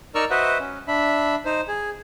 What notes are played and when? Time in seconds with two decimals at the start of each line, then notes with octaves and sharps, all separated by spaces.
0.15 D#4 A#4 D5 C#6 E6 F6
0.30 F#4 B4 C5 D#5 E5 F#5
0.60 C#4
0.88 D4 E5 B5
1.45 D#4 C5
1.68 G#4